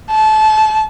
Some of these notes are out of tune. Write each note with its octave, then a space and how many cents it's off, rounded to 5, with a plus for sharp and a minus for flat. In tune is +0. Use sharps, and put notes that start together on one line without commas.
A5 -25